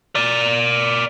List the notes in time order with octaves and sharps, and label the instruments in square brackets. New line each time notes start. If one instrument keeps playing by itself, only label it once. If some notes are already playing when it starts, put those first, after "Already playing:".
[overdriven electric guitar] A#4 D5